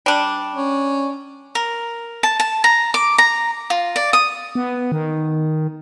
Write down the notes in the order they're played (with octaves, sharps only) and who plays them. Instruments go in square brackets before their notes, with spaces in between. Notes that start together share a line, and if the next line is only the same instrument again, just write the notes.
[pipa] G3 D4
[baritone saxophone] C#4
[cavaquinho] A#4
A5
A5
A#5
D6
A#5
F4
D5
D#6
[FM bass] B3
D#3